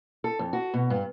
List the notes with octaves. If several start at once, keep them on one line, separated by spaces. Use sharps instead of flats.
A4
F2
F#4
B2
G2